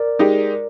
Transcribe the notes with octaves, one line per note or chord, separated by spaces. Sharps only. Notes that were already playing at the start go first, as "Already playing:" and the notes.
Already playing: A#4 D5
G#3 D#4 G4